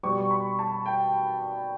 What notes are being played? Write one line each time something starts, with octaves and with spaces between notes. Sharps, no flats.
B2 G3 B3 C#6
B5
A5
G5